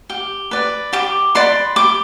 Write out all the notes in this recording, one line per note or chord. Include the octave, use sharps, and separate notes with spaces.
G4
B4 D5
G4 D6
B4 D5 C6
G4 D6